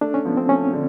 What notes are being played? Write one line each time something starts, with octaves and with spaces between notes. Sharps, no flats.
A3 D4
C#4
F3 B3
C4
A3 C#4
D3